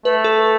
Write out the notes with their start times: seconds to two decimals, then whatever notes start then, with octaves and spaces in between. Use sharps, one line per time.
0.05 A3 B4
0.24 A4